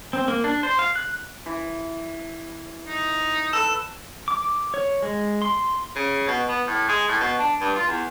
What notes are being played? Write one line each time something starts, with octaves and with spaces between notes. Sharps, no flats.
C4
A#3
D4
C5
F5
F#6
E3
D#4
A4 B4 E6 E7
D6
C#5
G#3
C6
C#3
B2
B3
A2
G#3
A2
B2
D4
G2
F4
E2